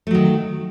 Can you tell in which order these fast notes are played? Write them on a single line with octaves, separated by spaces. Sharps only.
A3 F#3 D#3